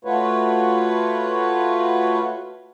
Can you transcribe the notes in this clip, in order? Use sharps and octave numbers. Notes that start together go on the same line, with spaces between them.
A3 F4 F#4 B4 C#5